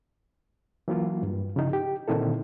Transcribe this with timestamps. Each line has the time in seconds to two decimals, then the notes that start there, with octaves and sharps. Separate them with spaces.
0.88 E3 F#3 A#3 F4
1.23 G2
1.56 C#3 F3 D#4 E4
1.73 G4
2.08 A#2 D3 D#3 C4 E4 A4